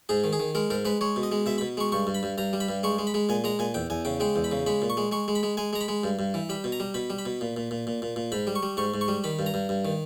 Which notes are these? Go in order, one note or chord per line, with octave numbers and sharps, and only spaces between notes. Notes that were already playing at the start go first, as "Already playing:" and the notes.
G#2 G#4
D#3
G#4
D#3
G#3 A#4
G#2 A#4
G#3 B4
G#3 C#5
B2
D#5
G#3
B2 E5
B5
B2
G#3 C#6
G2 C#6
G2
B5
G2
G2 A#5
G3
B5
G2
G#3 C#6
G#3
B5
G#3
A#2 G#5
G#3 A#5
A#2 G#5
E2 G5
E2 G#5
C#3 G5
G#3 G5
E2
B5
C#3
G#3 B5
A#2
C#6
G#3
G#3 C#6
G#3
B5
G#3
G#3 G#5
G#3 A#5
B5
G#3
G2
G2
E3
G3 B5
B2
A#5
G3
B2 B5
G3
B5
B2
A#2
A#2
A#2
A#2
A#2
A#2
G#2 B5
G3
C#6
G3
G#2 C#6
G#2
C#6
G3
D#3 B5
G2
A#5
G2
G2
D#3